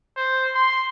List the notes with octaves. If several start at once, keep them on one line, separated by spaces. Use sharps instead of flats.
C5
C6